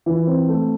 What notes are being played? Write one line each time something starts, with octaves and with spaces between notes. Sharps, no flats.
E3
C4
A3